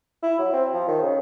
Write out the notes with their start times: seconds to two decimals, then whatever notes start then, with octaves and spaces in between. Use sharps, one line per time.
0.23 E4
0.39 F#3
0.53 C4
0.73 F3
0.88 D#3
1.02 C#3